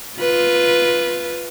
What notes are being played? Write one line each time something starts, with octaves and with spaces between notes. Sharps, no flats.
F4 B4